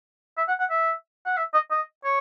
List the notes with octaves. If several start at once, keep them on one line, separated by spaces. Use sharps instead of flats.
E5
F#5
F#5
E5
F#5
E5
D#5
D#5
C#5